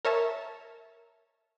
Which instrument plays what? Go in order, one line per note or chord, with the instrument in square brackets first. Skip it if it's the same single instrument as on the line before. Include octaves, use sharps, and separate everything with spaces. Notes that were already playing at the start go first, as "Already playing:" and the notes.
[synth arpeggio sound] A#4 C#5 E5 A5